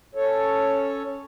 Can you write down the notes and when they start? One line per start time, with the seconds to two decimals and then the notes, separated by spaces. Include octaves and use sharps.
0.15 C#4 A4 C#5